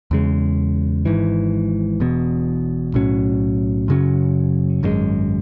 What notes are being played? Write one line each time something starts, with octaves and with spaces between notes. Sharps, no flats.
E2 C#3 G#3
G#1 G#2 E3
E1 E2 B2
B1 A2 F#3 C#4
F#2 C#3 F#3 C#4
G#1 F#2 C#3 G#3